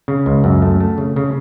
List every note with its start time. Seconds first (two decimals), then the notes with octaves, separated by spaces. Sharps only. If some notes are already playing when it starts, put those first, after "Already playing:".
0.08 C#3
0.26 C#2
0.44 F#2
0.62 A3
0.80 A3
0.98 C#3
1.16 C#3